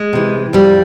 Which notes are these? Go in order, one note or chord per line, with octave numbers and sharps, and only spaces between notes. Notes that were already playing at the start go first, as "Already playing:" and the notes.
Already playing: G#3
C3 E3
F2 G3